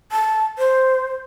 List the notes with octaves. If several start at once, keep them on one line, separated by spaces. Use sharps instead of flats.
A5
C5